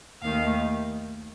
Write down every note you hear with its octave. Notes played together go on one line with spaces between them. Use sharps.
D#2 D#3 A3 F5